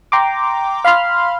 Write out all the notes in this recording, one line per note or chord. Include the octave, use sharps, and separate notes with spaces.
G5 A#5 C6 D6
F5 B5 C6 F6